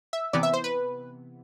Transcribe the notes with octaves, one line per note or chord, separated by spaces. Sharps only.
E5
C3 E3 B3 D5
E5
C5
B4